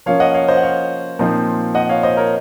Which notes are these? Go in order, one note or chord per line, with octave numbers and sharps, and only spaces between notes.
F3 A#3 C#4 C#5 F5
D#5 F#5
C#5 F5
C5 D#5
F#5
C#5 F5
A#2 F3 C4 D#4
D#5 F#5
C#5 F5
C5 D#5
A#4 C#5